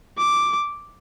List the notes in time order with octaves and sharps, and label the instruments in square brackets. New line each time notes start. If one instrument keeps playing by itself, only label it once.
[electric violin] D6